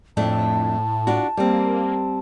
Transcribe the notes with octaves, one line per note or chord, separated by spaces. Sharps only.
F2 A2 A3 D4 A5
D4 F4 F#4
G3 A#3 C4